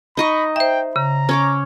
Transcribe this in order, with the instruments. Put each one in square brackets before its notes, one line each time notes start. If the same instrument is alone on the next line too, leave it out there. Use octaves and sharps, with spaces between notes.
[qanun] D#4 D#5 C#6 [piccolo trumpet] B5
[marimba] C5 E5 [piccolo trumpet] G5
[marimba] C#3 [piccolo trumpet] A#5
[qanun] C#4 C#5 D6